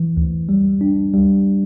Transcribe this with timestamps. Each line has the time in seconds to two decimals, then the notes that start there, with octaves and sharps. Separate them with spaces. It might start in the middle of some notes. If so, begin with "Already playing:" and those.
Already playing: E3
0.17 D2
0.49 G3
0.81 D4
1.14 G3